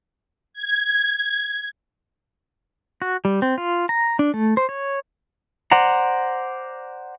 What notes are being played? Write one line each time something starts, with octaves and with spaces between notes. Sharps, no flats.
G#6
F#4
G3
C4
F4
A#5
D4
A3
C5
C#5
C5 D5 F#5 A#5